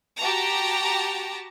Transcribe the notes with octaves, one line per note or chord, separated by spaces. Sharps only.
F#4 G4 A5 A#5